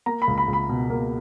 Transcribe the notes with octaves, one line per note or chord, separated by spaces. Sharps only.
A#3 A#5
B5
C#2
B5
C#2
B5
B2
A#3